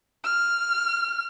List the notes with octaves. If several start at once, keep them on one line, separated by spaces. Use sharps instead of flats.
F6